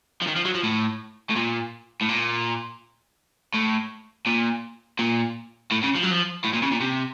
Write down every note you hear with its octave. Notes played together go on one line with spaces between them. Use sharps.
F3
D#3
F3
F#3
F3
A2
A2
A#2
A2
A#2
A2
A#2
A#2
A2
C#3
F3
F#3
F3
A2
A#2
C#3
A#2
C3